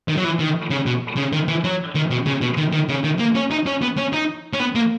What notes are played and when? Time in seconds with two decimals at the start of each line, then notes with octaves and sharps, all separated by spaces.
0.08 D#3
0.17 F#3
0.24 E3
0.39 D#3
0.70 C#3
0.86 B2
1.17 C#3
1.33 D#3
1.48 E3
1.64 F#3
1.95 D#3
2.11 B2
2.26 C#3
2.41 B2
2.57 D#3
2.73 D#3
2.89 C#3
3.04 D#3
3.19 A#3
3.35 C#4
3.51 D#4
3.66 C#4
3.82 B3
3.97 C#4
4.13 D#4
4.53 C#4
4.59 B3
4.75 A#3